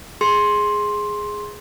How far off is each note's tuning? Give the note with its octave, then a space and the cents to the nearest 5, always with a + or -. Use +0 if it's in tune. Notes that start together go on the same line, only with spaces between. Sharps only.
G#4 +0 C6 +10